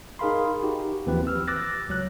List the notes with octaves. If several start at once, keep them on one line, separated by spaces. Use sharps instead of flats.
D#4 G#4 A#4 F5 B5 C6
D#4 F#4 G4
D#2 E3 F3 C4 G4 B4
E6 F6
D6 E6 F#6 A6 A#6
C#2 F#3 F#6